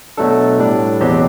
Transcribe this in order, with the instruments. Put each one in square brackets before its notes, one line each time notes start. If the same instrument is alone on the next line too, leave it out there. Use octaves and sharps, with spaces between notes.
[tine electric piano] B2 F#3 A3 D4 A4
A2 G3 D4
E2 B2 F#3 C4 G4